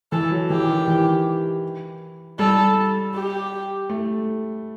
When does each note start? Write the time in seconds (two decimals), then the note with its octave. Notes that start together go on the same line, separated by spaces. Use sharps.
0.12 E3 A4
0.31 F#3
0.50 E3 G4
0.69 D#3
0.88 E3
2.39 G3 A4
3.15 G4
3.89 A3